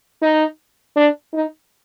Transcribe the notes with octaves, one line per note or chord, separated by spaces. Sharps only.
D#4
D4
D#4